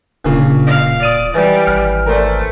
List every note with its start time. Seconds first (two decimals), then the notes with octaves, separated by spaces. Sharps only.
0.25 D1 A#2 C#3 D4
0.67 F5
1.03 D5 D#6 D#7
1.35 E3 G3
1.67 G#1 F6
2.06 A3 A#4 C5 D5